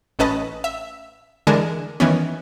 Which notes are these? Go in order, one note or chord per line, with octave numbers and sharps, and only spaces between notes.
A1 A2 C#4 B4 D#5 A5
E5
D3 E3 G#3 D4 G#4 A#4
D#3 E3 B3 C#4